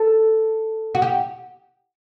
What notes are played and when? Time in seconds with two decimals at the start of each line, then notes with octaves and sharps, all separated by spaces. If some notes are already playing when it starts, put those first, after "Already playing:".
Already playing: A4
0.95 F#4
1.02 G4